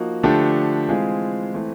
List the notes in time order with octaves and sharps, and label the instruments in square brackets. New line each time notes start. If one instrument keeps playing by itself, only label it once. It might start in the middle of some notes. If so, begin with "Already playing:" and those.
Already playing: [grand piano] F3 A#3 D#4 F#4
D3 F3 A3 D4 G4
E3 G#3 C4 F4 G#4
E3 A3 C4